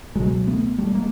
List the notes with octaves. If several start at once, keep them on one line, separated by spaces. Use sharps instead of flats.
C#2 B2 F#3 G#3
A3 B3
G3 A3
G#3 A#3